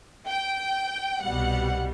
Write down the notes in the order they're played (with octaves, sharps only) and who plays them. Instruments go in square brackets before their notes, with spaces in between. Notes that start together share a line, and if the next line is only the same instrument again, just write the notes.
[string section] G5
C2 B2 G3 F#5